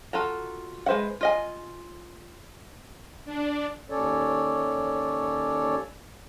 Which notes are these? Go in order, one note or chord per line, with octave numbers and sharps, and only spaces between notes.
F4 F#4 A4 A#5
G#3 B4 C5 E5 F#5
F4 D#5 G#5
D4
D#2 C#4 A4 C#5 D5